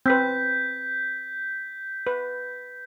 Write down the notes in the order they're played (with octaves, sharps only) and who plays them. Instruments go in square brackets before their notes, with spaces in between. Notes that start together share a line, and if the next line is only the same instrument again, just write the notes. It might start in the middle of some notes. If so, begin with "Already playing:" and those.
[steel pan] C4 B4 [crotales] G6 B6
[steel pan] B4